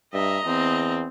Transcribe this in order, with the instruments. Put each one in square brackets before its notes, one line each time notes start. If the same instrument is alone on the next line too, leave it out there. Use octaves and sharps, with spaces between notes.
[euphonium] G2 [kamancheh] D#5 A#5 [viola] E5
[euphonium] E2 [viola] C4